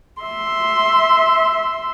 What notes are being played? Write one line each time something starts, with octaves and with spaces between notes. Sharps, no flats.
E5 C6